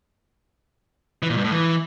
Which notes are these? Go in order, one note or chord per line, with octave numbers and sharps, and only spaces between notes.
E3
A#2
G2
A2
E3